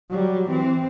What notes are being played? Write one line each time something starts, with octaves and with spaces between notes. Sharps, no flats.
F#3 G3
E3 C4